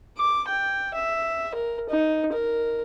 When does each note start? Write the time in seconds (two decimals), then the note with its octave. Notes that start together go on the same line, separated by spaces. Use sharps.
0.18 D6
0.48 G5
0.95 E5
1.54 A#4
1.89 D#4
2.32 A#4